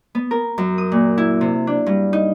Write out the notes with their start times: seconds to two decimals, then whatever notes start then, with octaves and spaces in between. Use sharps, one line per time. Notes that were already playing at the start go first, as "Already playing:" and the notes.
0.15 B3
0.31 A#4
0.58 F#2
0.78 D#6
0.92 A#2
1.18 E4
1.41 C3
1.67 D4
1.86 G2
2.13 D#4